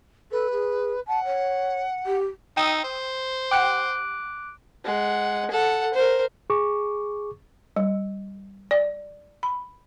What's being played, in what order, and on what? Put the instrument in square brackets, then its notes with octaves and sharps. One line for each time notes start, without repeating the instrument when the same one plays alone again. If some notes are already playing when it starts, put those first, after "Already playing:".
[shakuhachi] A4 [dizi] B4
[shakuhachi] G#4
[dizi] F#5 [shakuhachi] A5
[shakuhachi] C#5
G4
[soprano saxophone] D#4 [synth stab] G5 D#6 E6
[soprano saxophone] C5
[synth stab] G4 F#5 G5 [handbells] D6 F#6 D7
[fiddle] G#3 F#5
A4 F#5
A#4 C5
[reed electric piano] G#4 C#6 D6
[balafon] G3
D5
B5